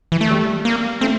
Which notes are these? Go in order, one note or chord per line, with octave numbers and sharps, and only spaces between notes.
E3
A3
G3
A#3
A3 C4